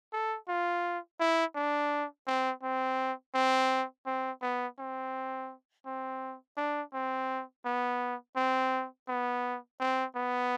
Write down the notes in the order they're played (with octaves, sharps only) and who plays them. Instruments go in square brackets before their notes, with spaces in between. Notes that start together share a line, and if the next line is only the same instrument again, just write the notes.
[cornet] A4
F4
E4
D4
C4
C4
C4
C4
B3
C4
C4
D4
C4
B3
C4
B3
C4
B3